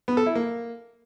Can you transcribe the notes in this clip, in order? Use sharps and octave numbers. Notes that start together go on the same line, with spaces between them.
B3
A4
E4
A#3